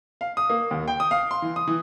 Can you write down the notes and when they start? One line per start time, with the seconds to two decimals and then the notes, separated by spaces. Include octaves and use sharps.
0.21 F5
0.37 D#6
0.50 A#3
0.71 D#2
0.88 G5
1.00 D#6
1.11 F5
1.31 C6
1.42 E3
1.56 D#6
1.68 E3